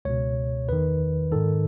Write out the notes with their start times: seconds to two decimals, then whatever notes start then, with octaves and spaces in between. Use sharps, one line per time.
0.05 C#2 B2 C#5
0.69 E2 D#3 B4
1.31 G#2 D#3 A4